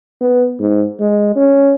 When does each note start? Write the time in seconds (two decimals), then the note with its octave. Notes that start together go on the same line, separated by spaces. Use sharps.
0.21 B3
0.59 G#2
1.00 G#3
1.36 C#4